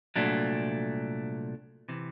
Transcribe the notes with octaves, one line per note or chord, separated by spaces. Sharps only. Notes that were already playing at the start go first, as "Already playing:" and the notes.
C2 A#2 F#3 A3 D4
C3 E3